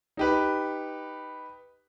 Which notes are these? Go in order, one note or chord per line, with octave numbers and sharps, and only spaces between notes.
D#4 G4 B4